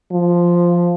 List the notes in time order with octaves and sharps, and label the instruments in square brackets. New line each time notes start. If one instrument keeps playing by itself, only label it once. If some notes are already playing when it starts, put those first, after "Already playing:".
[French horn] F3